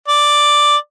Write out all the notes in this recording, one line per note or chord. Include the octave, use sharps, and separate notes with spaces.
D5